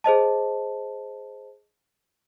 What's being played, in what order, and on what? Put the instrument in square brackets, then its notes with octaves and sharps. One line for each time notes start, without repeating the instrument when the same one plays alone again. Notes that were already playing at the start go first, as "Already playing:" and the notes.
[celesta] G#4 C5 D#5 A5